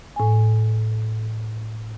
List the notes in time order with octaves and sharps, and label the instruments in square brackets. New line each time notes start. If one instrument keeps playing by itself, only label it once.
[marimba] A2 G#5